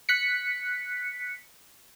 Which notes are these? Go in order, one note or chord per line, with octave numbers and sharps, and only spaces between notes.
F#6 B6 C#7